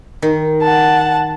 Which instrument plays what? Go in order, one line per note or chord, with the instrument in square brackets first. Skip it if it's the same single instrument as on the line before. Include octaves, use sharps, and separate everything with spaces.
[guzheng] D#3
[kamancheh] F#5 A5